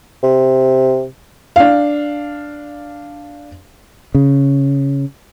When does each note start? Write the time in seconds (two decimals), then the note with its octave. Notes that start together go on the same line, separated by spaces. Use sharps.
0.24 C3
1.56 D4 F5
4.15 C#3